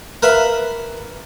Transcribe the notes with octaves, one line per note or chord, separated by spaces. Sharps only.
A#4 B4 E5 F5 B5